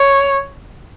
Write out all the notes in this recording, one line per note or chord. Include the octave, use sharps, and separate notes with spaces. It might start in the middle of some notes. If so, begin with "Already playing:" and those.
Already playing: C#5